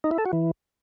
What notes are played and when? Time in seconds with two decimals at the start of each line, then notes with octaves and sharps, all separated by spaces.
0.04 D#4
0.11 E4
0.18 A4
0.26 F#4
0.33 E3